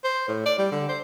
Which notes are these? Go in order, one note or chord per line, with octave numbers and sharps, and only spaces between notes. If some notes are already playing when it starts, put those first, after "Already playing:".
C5
A2
D5
G3
D3
C5